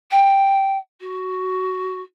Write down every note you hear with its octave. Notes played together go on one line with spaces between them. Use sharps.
G5
F#4